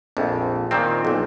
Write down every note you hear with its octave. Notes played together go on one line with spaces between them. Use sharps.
A#1 F2
A#2 D#3 C4
B1 A#2